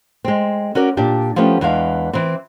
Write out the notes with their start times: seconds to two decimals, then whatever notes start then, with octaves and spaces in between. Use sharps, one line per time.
0.25 G#3 C4
0.75 C#4 F#4 A#4 D5
0.97 A#2 D4 G4
1.36 F3 A3 B3 C#4 D#4 G4
1.61 E2 E3 G#3 D4 F5
2.13 E3 C4